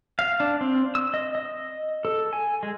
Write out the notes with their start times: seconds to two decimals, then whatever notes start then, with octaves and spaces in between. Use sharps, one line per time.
0.19 F5
0.40 D4
0.61 C4
0.95 E6
1.14 D#5
1.35 D#5
2.05 A4
2.33 G#5
2.63 G#3